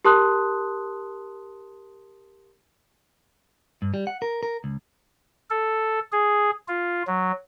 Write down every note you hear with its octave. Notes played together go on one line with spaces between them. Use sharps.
G4 A#4 A5 C6 D#6 F#6
G2
G3
F#5
A#4
A#4
C#2
A4
G#4
F4
F#3